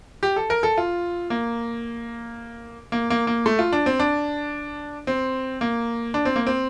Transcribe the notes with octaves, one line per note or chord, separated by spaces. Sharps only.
G4
A4
A#4
A4
F4
A#3
A#3
A#3
A#3
A3
F4
D4
C4
D4
C4
A#3
D4
C4
A#3
C4